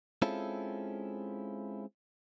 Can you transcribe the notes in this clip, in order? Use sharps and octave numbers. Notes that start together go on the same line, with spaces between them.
G#3 C4 C#4 E4 F4 A4